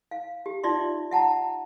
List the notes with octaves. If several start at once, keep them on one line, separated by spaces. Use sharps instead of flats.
F5
G4
D#4 F4 D5 E5 C6
E5 F#5 A5 A#5